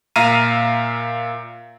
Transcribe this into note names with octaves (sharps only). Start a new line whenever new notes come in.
A#2 E5 F5 A#5 F6 D#7